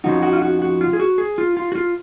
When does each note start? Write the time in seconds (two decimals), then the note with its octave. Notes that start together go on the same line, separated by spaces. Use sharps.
0.04 F2 C#3 F3 D#4 F#4
0.23 F#4
0.33 F4
0.42 F#4
0.62 F#4
0.81 F4
0.93 G#4
1.00 F#4
1.18 G#4
1.38 F4
1.57 F4
1.72 F#4
1.75 F4